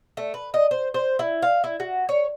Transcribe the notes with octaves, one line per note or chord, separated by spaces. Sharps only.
A3
B4
D#5
C5
C5
E4
F5
E4
F#4
C#5